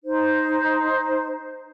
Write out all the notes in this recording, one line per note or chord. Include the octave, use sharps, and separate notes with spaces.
D#4 C5